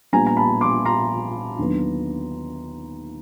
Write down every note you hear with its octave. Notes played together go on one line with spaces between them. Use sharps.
A#1 A#2 G3 B3 G#5 A#5
A#5
A5 B5
C6 D6
A#5 C6
D#2 D3 F#3 B3